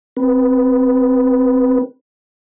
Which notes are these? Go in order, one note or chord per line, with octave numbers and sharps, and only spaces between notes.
C4 B4